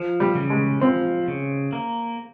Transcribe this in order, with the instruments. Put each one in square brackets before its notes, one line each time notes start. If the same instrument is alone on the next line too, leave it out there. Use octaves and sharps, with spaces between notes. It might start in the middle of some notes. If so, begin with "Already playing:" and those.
Already playing: [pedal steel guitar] F3
[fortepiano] G3
[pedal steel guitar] C#3
[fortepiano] G#3
[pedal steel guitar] F3 [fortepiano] C4
[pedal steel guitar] C#3
A#3